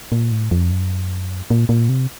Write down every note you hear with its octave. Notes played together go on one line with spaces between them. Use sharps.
A#2
A2
F2
F#2
A#2
A#2
C3